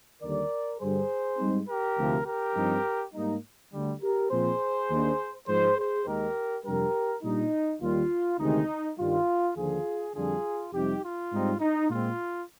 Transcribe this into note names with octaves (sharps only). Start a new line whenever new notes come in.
D#2 D3 G3 A#4 D5
G2 D3 G3 G#4 C5
G#2 G3 C4 D#4
G4 A#4
D2 C3 F3
G4 A#4
G2 F3 C4 D#4
G#2 G3 A#3 D#4
D2 D3 G3
G4 A#4
A#2 F3 C4 G#4 C5
D#2 D#3 A#3 D4
G#2 F3 G#3 G#4 C5
G#4 C5
D#2 D#3 G#3 D#4 G4 A#4
F2 C3 G3 D4 G4 A#4
A#2 G3 D4 D#4
D#2 D#3 G3 F4
D2 C3 D#3 G#3 D#4
G2 D#3 G3 F4
D#2 D3 F3 F4 G#4
F2 D3 G3 D4 F4 G#4
F2 C3 G3 D#4 G4
F4
G#2 G3 C4 D#4
D#4
A#2 G#3 C4 F4